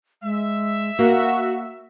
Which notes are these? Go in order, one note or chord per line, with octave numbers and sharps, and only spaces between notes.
G#3 E5
A#3 F#4 F#5